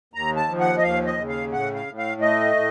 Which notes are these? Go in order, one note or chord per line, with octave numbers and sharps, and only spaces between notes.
D#2 A#5
A5
F3
F#5
D#5
D#2 F5
D#5
C#3
F5
A2 F#5
F5
A2
F5
A3 D#5
A2